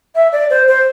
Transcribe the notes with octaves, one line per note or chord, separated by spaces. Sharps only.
E5
D5
C5
C5